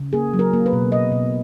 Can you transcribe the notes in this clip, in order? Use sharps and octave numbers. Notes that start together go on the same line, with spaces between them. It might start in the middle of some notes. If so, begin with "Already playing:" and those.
Already playing: C#3
A#3 G#4
F#3
A#4
A#3
B4
B2
B2 D#5
B2